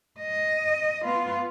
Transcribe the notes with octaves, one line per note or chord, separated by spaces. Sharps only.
D#5
B3 F4